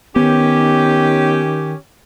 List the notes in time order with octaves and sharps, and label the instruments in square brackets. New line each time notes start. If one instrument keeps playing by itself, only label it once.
[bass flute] D#3 [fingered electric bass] B3 [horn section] C#4 G4